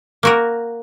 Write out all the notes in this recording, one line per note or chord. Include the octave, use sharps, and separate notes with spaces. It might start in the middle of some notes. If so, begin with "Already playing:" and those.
A#3 F#4 A#4